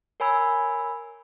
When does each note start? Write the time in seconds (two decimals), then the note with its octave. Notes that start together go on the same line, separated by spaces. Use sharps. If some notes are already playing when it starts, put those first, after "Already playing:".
0.20 A#4 C#5 G#5 B5 E6 G#6